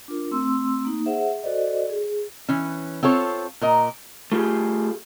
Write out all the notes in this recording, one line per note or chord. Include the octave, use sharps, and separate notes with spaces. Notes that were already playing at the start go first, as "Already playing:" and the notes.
D4 F4 A#4
A3 C4 C6 E6
A#3 D#4
G#4 C5 E5 F#5
F#4 A4 C5 D5 D#5
G#4
E3 C#4
C4 F4 A4 C#5
A#2 A#4 D#5
A3 F4 G4 G#4